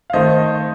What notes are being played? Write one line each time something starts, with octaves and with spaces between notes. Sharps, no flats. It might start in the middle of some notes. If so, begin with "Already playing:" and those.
F5
D#3 A3 C5 D#5